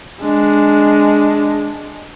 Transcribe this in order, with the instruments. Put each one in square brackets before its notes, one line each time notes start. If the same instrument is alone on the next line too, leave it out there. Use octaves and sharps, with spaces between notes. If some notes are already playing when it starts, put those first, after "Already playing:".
[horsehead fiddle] G#3 D4